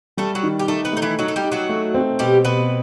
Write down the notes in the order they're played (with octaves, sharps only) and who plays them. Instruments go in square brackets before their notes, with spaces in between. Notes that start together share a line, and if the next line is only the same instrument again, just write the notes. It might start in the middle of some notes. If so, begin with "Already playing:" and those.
[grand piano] G3 [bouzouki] A3 A4
[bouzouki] F#3 F#4
[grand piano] D#3
[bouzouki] G4
[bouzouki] A3 A4 [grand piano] D#4
[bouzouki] B3 B4
[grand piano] A3 [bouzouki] D#4
[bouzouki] E3 E4
[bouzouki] F#3 F#4 [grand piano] D#4
[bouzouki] A4
G3 G4
[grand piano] D#4
[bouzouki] F#3 F#4
[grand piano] A3
C4
[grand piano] B2 [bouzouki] G3 G4
[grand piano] B2 [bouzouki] B3 B4